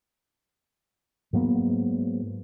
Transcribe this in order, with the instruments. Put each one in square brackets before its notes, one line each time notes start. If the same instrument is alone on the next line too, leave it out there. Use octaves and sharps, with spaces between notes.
[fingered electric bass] G#2 F#3 A#3 B3